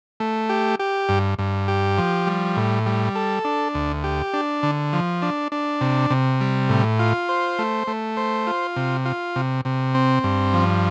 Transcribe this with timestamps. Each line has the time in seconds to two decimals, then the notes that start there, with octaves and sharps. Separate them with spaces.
0.20 A3
0.49 G4
0.80 G4
1.09 G2
1.38 G2
1.68 G4
1.98 F3
2.27 G3
2.57 A2
2.86 G3
3.15 A4
3.45 D4
3.74 D2
4.04 G4
4.34 D4
4.63 D3
4.93 F3
5.22 D4
5.52 D4
5.81 C3
6.10 C3
6.41 G3
6.69 A2
6.99 F4
7.29 C5
7.59 A3
7.87 A3
8.17 C5
8.47 F4
8.76 C3
9.05 F4
9.36 C3
9.65 C3
9.95 C4
10.24 G2
10.54 F3